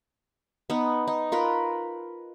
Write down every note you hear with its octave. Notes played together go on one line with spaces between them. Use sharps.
B3 D#4
D#4
F4 A#4 B4